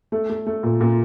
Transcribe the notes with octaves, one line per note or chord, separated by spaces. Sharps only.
A3
A3
A3
A#2
A#2